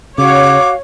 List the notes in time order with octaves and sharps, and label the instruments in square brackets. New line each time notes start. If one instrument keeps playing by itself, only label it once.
[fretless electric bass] C#3 [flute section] F#4 F5 [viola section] C#5 [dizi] D6